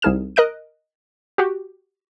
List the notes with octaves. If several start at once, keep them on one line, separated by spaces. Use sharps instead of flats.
C2 D#4 G#4 F6 E7
A#4 D#5 F#6 D7
F#4 G4